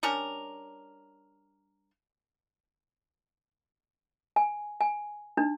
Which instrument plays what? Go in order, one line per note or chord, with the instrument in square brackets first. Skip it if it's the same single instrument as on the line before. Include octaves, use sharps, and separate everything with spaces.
[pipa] G3 C#4 D4 A#4
[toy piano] G#5
G#5
D4 D#4